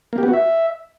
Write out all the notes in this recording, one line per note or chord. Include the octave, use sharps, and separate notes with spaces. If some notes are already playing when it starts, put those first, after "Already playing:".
A#3
G4
B3
F#4
E5